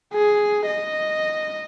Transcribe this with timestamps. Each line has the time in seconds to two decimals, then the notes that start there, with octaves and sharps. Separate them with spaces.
0.13 G#4
0.66 D#5